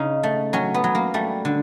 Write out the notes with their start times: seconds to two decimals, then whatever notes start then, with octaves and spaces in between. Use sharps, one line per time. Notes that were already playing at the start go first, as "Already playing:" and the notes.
Already playing: C#3 D#4
0.23 A3
0.53 F#3 C#4
0.74 B3
0.84 F#3
0.95 A#3
1.14 G3 A3
1.45 D3